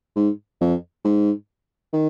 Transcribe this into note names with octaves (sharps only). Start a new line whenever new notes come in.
G#2
F2
G#2
D#3